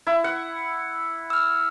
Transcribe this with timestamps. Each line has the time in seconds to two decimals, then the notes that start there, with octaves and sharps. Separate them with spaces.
0.07 E4
0.24 F#5
1.30 E6 F6